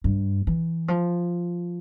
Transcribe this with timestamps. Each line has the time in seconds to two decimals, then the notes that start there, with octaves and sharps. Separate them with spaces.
0.04 G2
0.47 E3
0.88 F3